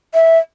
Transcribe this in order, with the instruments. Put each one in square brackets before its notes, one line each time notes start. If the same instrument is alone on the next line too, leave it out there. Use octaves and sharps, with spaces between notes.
[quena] E5